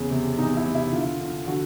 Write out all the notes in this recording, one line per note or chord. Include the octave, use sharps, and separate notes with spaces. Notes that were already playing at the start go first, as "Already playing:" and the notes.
Already playing: E2 C#3
C3
E2 D#4
E4
C3
E4
D3 F4
D3
D3 F#4